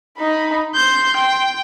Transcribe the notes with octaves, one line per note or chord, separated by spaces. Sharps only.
D#4 B5
C6 G6
G5